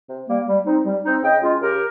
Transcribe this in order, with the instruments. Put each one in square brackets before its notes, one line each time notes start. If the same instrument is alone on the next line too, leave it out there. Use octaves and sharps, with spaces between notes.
[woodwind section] C3
G3 A#3
G3
C4 D#4
G3
C4 D#4
C#3 D#5 G5
G#3 C#4 F4
C#3 G4 A#4